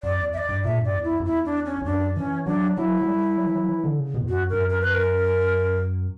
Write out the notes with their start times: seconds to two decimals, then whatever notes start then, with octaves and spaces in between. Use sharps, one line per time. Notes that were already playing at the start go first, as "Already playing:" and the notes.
0.03 F#2 D5
0.19 E2
0.33 E5
0.38 D5
0.49 G2
0.64 A#2 E5
0.79 G2
0.85 D5
0.94 E2
1.04 E4
1.20 F#2
1.25 E2 E4
1.45 D4
1.66 C#4
1.81 E2
1.85 F#2 D4
2.17 E3 C#4
2.46 F#3 D4
2.77 F#3 E4
3.01 F#3
3.07 G3
3.37 F#3
3.46 E3
3.55 F#3
3.69 E3
3.84 D3
3.99 C#3
4.14 B2
4.21 E2
4.29 F#2 F#4
4.50 G2 A#4
4.59 F#2
4.69 A#4
4.81 B4
4.94 A#4